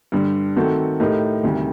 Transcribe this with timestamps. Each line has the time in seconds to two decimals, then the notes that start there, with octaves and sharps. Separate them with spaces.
0.12 G2 D3 G3
0.56 D#3 A3 C4 F#4 A4
1.00 A2 A3 D#4 G4 A#4
1.43 D2 C3 D#3 G3